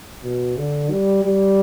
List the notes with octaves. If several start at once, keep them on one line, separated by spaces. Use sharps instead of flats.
B2
D3
G3
G3